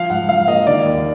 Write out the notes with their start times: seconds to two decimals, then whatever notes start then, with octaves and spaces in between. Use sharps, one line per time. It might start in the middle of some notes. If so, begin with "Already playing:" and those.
Already playing: F3 F5
0.10 G#2 F#5
0.29 F3 F5
0.48 A#3 D#5
0.67 D#3 D5
0.85 D#2